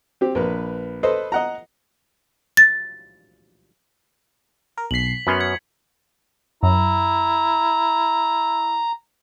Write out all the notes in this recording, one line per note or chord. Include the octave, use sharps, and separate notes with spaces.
C4 G4
A#1 A#4 B4
A4 B4 C5 D#5
D#5 F#5 A#5
A6
A#4
B1 B6 C7 F#7
F#2 B3 C#4 B5 C6 F6
G#6 C#7
F#2 E4 A#5